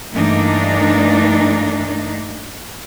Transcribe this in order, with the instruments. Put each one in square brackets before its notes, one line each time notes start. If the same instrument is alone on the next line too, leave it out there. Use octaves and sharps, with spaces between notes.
[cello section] G2 E3 A3 A#3 D4 D#4